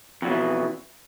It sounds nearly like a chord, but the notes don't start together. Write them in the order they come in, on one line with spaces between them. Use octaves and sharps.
F2 F#3 B2 E3